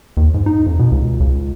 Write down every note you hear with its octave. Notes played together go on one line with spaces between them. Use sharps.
D#2
G#2
D#4
F2
B2
C#2
C#2